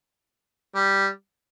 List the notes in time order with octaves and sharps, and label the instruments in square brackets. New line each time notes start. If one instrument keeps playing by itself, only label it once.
[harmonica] G3